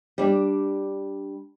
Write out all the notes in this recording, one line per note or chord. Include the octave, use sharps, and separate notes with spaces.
G3 D4